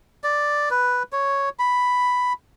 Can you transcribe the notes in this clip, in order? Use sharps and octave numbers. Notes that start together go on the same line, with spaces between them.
D5
B4
C#5
B5